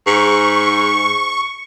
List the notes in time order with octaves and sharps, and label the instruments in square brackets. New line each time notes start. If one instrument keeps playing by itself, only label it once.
[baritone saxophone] G#2 [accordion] C#6